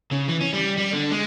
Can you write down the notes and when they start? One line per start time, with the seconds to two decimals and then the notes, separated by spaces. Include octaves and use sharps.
0.11 C#3
0.28 E3
0.41 C#4
0.53 G3
0.77 G3
0.92 D3
1.11 G#3